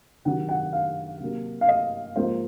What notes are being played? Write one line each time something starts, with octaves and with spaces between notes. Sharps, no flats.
C3 D#3 F#3 F#5
F#5
F5
C3 F#3 A#3
F5
D#5
G#2 F3 A#3 C5